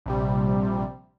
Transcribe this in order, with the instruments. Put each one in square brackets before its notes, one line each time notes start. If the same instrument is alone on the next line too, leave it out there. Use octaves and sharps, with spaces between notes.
[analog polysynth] A#1 C3 G3